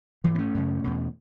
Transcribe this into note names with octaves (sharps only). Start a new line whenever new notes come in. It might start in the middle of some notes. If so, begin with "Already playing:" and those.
G#2 E3
B3
A3 C#4
F#2 C#3
E2 B2